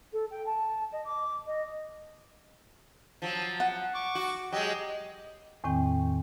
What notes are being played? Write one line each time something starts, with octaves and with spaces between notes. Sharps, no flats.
A4
G5
A5
D#5
D6
D#5
F3 F#3
F#5
C#6 D6
F#4
F#3 G#3 G4 D#5 G5
D#5
E2 A2 D#3 C4 G5